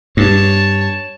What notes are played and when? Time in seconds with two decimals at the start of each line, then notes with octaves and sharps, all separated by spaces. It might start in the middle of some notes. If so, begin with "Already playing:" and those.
0.17 G2 C#5 A5